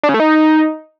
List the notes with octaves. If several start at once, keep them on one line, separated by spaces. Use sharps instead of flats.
D4
C#3
A3
D#4